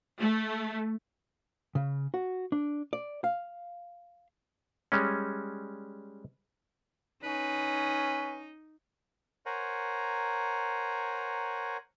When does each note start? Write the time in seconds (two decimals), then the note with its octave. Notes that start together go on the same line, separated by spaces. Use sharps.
0.21 A3
1.75 C#3
2.14 F#4
2.52 D4
2.93 D5
3.24 F5
4.92 G3 G#3 C#4
7.23 C#4 D#4 B4
9.46 A#4 C5 C#5 F#5 G#5 A#5